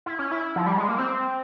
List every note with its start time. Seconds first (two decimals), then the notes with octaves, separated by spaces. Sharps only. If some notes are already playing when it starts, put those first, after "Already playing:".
0.06 E4
0.19 C#4
0.31 E4
0.56 F3
0.66 G3
0.78 G#3
0.88 A#3
0.98 C4